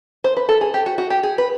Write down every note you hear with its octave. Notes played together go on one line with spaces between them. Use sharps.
C5
B4
A4
G#4
G4
F#4
F#4
G4
G#4
B4